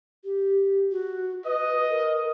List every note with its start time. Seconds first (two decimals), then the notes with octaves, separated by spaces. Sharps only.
0.24 G4
0.91 F#4
1.45 B4 D#5
1.90 A#4